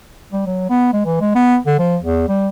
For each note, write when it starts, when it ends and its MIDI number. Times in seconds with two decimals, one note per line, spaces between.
0.33 0.44 55
0.46 0.68 54
0.70 0.92 59
0.93 1.04 56
1.06 1.17 52
1.21 1.33 56
1.35 1.58 59
1.67 1.76 50
1.79 1.97 53
2.03 2.28 40
2.28 2.48 55